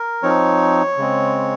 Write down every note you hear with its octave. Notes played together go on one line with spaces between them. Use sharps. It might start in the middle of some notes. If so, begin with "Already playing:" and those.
Already playing: A#4
F3 C4 D#4 C#5
C#3 G#3 C4